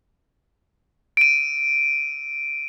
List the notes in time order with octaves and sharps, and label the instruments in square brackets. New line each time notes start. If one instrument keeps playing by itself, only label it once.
[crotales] D7 D#7